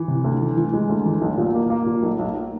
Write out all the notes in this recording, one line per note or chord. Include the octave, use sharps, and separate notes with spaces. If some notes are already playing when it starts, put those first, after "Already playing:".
Already playing: E3
C3
D2
E3
E3
G#3
D2
E3
B1
A#2
A#3
A#3
A#2
B1
B1